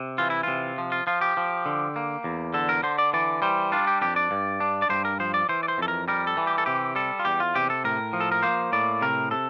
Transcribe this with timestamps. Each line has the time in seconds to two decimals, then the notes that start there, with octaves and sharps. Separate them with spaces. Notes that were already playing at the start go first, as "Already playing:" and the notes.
Already playing: C3
0.18 E3 F4
0.30 E4
0.43 C3 F4
0.78 F3
0.92 F4
1.07 F3 F4
1.21 G4
1.37 F3
1.66 D3
1.96 A#3
2.24 E2
2.54 D3 A4
2.69 A#4
2.83 D3 C5
2.98 D5
3.13 E3 D5
3.42 G3 C5
3.72 D4 F4
3.87 G4
4.01 F2 G4
4.16 D5
4.31 G2
4.60 D4
4.82 D5
4.89 G2 C5
5.05 A#4
5.20 F3 C5
5.34 D5
5.49 E3 C5
5.63 D5
5.68 C5
5.78 F2 A4
5.88 A#4
6.08 G3 A#4
6.27 A4
6.37 E3
6.47 G4
6.58 A4
6.66 C3 G4
6.95 G3 A4
7.19 F4
7.25 E2 G4
7.40 F4
7.55 C3 G4
7.70 A4
7.84 A2 A#4
8.13 F3
8.20 A4
8.32 A#4
8.43 A#3 C5
8.73 A2 D5
9.02 C3 A#4
9.31 C3 A4